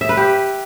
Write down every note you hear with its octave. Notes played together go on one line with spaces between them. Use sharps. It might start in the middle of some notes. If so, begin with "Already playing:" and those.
E5
B4
G4